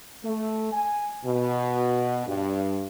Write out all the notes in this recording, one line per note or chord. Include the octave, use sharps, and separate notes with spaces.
A3
G#5
B2
G2